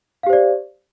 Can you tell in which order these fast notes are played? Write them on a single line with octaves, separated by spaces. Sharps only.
F5 G4 C5 D5